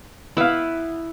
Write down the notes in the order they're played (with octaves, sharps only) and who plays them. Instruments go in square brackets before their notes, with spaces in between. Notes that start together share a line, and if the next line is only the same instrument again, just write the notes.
[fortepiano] B3 F5 [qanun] E4 B4